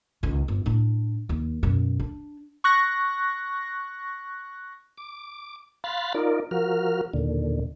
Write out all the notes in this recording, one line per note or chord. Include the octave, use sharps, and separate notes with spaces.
C#2 D#3
G1
A2 D4
D#2
F#2 B2
D4
C#6 F#6 A#6
D6
F5 B5 C6 F#6 A6
D#4 F4 A#4 D5
F3 F#4 A#4 F6
D#2 A#2 D3